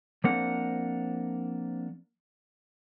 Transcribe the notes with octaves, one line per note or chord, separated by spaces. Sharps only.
F3 A#3 C4 D4 A#4 F#5